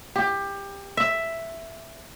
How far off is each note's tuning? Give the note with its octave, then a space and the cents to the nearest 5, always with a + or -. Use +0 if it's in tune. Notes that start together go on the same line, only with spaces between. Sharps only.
G4 +20
E5 +5